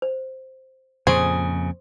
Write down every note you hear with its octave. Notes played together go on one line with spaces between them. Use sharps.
C5
F2 A#2 C#3 G#4 C5 C6 C#6